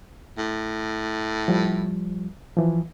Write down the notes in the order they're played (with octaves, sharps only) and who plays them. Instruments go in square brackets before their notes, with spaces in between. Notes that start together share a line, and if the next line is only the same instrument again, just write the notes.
[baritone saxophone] A2
[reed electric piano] F3 G3
E3 F3